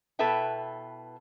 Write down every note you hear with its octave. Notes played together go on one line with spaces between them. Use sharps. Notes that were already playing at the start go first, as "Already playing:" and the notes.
B2 E4 A4 B4 E5 G5